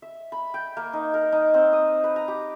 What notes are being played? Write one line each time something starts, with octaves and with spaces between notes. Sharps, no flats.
E5
B5
G5
A#3
D#4
A#4
D#4
C4
D#6
B4
A#5
G4